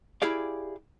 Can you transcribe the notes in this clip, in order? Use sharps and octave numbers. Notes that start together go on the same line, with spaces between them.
E4 G4 G#4 D5 F5